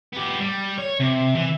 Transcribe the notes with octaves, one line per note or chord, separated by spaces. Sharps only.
B3 G4
G3
C#5
C3
E3